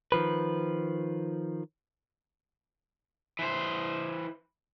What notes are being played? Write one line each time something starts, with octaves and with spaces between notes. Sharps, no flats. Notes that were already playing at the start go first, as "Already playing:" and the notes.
D#3 F3 B4
E3 C5